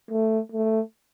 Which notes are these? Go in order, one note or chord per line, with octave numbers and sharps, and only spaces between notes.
A3
A3